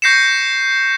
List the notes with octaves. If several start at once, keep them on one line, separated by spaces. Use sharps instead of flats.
C#6 G6 A#6 C7 C#7 E7